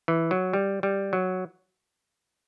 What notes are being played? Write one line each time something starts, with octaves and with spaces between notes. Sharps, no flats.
E3
F#3
G3
G3
F#3